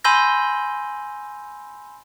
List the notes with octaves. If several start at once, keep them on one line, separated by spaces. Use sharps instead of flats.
G#5 B5 C6 E6 G6 A#6